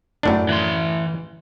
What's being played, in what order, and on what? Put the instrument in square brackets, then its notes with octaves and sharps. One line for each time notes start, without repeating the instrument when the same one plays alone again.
[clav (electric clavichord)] F#2 A2 D4
[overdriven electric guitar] E3 C6